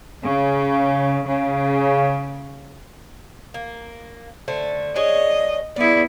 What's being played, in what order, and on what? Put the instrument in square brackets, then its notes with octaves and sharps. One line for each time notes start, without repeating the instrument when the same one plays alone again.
[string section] C#3
C#3
[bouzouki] A#3
D3 A3 C5
[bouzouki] D4 G#4 C#5 [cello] D#5
[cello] B3 E4 [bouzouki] G#4 D5